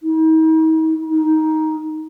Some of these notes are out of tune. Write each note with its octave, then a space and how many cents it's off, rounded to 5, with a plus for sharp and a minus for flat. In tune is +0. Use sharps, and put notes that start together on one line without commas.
D#4 +40
D#4 +10